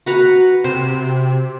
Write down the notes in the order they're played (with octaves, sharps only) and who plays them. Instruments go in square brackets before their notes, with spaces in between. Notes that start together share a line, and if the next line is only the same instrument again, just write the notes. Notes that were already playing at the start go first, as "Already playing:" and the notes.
[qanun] F#4 B4 A#5
[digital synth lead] C3 [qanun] C5